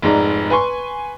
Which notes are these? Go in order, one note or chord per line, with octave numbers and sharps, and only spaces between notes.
F1 G#2 G#3 D5 A#5
B4 G#5 C6 C#6